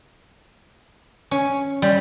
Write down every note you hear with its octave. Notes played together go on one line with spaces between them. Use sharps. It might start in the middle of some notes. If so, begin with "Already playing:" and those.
C#4
G3